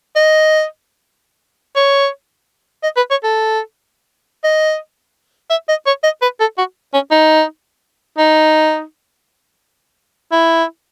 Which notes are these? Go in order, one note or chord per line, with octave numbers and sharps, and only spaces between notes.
D#5
C#5
D#5
B4
C#5
A4
D#5
E5
D#5
C#5
D#5
B4
A4
F#4
C#4
D#4
D#4
E4